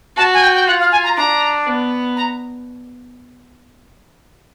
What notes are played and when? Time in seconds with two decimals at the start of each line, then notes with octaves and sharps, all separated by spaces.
0.17 F#4 A5
0.34 G#5
0.42 G5
0.55 G5
0.67 F4 F#5
0.79 F5
0.92 G#5
1.04 A#5
1.17 D4 A#5
1.66 B3
2.17 A#5